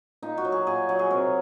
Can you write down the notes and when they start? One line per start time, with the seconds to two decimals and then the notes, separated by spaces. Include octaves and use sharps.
0.22 A#2 D#4
0.37 F#4
0.45 F#3
0.52 G#4
0.67 A#2 G#4
0.89 F#3
0.99 G#4
1.11 C3 A#4